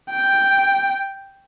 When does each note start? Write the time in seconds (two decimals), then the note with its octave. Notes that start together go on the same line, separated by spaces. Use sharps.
0.11 G5